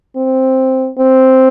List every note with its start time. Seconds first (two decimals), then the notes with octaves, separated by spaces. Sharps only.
0.17 C4
0.98 C4